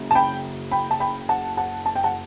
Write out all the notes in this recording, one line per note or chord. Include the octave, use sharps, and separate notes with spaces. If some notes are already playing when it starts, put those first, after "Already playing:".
Already playing: F#1 F#2 C#3
A5
G5 B5
G5 B5
A5
G5 B5
F#5 A5
F#5 A5
A5
G5
F#5 A5